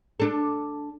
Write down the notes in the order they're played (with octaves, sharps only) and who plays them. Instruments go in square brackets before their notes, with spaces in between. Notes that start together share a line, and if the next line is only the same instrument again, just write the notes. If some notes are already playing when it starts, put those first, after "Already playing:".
[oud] D4 A4